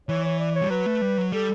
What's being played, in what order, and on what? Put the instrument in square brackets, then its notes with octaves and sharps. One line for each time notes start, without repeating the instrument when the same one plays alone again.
[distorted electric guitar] E3 [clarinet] C#5
[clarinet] C#5
D5
C#5
[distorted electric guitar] G3
[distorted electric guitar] F#3 [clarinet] B4
[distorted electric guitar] A3
G3
F#3
[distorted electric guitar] G3 [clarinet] A4